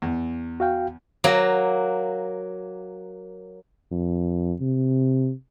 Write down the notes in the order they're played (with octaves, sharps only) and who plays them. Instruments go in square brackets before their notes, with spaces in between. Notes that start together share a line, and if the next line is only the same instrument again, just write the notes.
[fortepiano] E2
[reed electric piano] F#4 F5 G5
[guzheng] F#3 A#3
[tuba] F2
C3